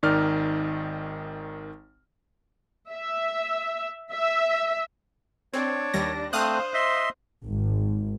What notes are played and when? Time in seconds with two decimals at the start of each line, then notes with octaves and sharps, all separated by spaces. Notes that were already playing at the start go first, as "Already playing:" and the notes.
0.03 G#1 D#3 D#4 D5 F6
2.91 E5
4.13 E5
5.53 C4 D4 C#5
5.94 D#2 G3 A#6
6.33 A3 C4 C5 F5 D#6 F#6
6.74 D#5 E5 C6
7.45 G#1